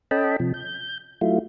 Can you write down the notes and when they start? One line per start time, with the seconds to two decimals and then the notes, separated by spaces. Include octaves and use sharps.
0.11 C#4 A4 D#5 G5 A5 B5
0.40 C3 F3
0.54 G6
1.21 F#3 A3 E4 F4